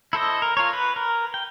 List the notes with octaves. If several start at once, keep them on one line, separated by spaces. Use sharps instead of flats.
E4 A4 C5 D#5
A#4
F4 A#4 C#5
B4
A#4
G5